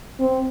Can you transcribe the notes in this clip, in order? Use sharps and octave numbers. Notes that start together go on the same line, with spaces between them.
C4